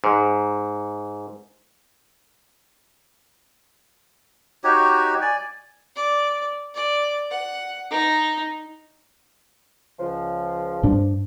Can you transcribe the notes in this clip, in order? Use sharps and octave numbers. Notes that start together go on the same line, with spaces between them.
G#2
D#4 F#4 G4 C#5
D5 G#5
D5
D5
F#5
D#4
C#2 F3
G2 D4